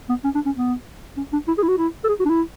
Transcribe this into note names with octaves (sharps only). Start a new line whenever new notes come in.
B3
C#4
D4
C#4
B3
C#4
D4
E4
G#4
E4
F#4
E4
A4
G#4
F#4
D4
E4